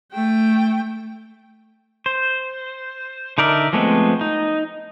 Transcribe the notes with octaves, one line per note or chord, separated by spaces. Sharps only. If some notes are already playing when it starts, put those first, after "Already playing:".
A3 G5
C5
D3 D#4 A#4 D5 E5
F3 G#3 A3 B3 C4
D#4